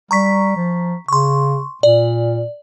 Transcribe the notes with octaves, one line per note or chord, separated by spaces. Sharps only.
G3 A#5 C#6 B6
F3
C#3 C6 C#6
A#2 D5